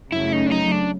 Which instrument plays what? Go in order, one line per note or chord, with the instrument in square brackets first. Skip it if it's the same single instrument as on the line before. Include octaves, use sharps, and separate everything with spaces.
[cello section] F#2 C#3 F#3 A3 C#4 [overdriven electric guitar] E4
[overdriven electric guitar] D#4
D4
D#4
D4